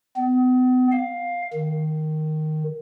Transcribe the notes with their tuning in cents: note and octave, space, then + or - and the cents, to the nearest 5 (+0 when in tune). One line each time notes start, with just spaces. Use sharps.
B3 +40
F5 +10
D#3 -5